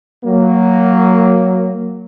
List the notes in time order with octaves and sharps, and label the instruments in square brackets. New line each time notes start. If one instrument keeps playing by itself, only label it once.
[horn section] F#3 A#3